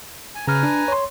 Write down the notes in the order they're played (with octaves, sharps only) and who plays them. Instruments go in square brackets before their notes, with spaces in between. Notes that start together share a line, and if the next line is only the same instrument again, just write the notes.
[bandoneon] G#5
[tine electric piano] C#3 F6 [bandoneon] B4 G#5 A#5
[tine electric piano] D4
C#5 C6